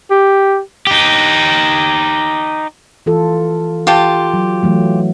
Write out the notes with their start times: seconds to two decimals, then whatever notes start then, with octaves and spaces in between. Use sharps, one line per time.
0.10 G4
0.87 D#4 G4
3.06 E3 F4 A4
3.87 F4 G4 A5
4.34 F#3
4.63 E3 F#3 A3